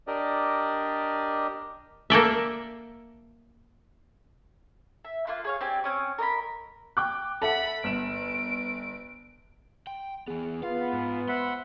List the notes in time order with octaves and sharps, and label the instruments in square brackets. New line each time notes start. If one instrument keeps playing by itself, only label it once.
[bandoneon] D4 G4 A#4 D5 D#5
[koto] A#3 A4 D5 E5
[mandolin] E5
A#3 F4 C6 F#6
G#4 C#5 F5
C4 G4 D5 G#5
C4 C#4 D#6
A#4 D#5 A5 B5
[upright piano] G5 D6 F#6
[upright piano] A4 E5 F#5 [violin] B5
[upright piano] G1 E7 [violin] D7
[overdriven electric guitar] G5 [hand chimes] C6
[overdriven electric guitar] E3 B3 [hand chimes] G#4
[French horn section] B3 [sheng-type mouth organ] F4 [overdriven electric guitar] F5
[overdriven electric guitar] G#2
[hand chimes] C5 [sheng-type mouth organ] E5 F#5 B5 [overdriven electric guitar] C6